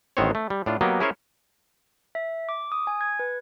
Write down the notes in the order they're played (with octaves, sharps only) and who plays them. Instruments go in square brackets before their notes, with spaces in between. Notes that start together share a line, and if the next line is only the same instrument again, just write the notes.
[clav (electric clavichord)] A1 D#3 B3 C4 C5 C#5
A3
G3
A2 D4 F4
F#3 A#3 B3 G4 D#5
C#4 E4 G#4 A#4 C5 C#5
[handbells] E5
D6
D#6
G#5
G#6
B4